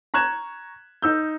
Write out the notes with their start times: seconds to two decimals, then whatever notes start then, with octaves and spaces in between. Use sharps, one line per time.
0.14 A#5 C#6 F#6 G#6 E7
1.02 D#4 E6 G6